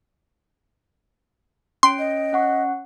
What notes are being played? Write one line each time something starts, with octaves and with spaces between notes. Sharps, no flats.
C#4 G5 C6 D7
D#5
C#4 F#5 C#6